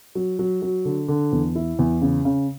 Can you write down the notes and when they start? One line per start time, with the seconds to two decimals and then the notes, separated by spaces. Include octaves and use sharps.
0.15 F#3
0.39 F#3
0.62 F#3
0.85 D3
1.08 D3
1.32 E2
1.55 E4
1.79 E2
2.02 C#3
2.25 C#3